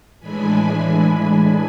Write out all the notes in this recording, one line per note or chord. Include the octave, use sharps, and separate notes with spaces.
A2 E3 G#3 D4 G#5 B5